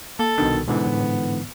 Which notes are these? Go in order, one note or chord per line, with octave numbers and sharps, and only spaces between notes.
A#3 A4
C2 B2 D#3 D4
G#2 B2 D3 E3 B3
A2
A2